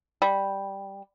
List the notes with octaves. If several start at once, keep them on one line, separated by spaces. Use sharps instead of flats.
G3